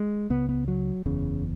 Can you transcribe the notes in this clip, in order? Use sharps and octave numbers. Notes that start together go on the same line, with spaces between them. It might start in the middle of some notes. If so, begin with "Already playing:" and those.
Already playing: G#3
C#2 C#3 B3
B3
F#3
F#1 E2 C#3